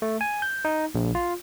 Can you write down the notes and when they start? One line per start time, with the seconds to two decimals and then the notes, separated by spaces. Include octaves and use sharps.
0.02 A3
0.21 G#5
0.42 G6
0.65 D#4
0.95 A#1
1.15 F4